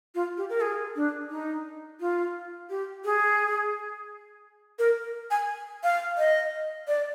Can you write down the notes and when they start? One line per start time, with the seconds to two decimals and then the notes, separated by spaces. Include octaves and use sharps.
0.15 F4
0.37 G4
0.50 A#4
0.61 G#4
0.96 D4
1.30 D#4
2.00 F4
2.70 G4
3.05 G#4
4.79 A#4
5.31 G#5
5.84 F5
6.18 D#5
6.88 D5